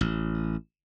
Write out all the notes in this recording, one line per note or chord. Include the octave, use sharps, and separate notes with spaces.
A1